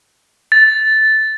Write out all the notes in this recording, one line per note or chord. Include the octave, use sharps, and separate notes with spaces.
A6